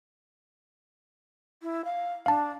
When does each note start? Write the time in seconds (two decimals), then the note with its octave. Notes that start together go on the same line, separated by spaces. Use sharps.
1.62 E4
1.85 F5
2.26 D4 F5 A5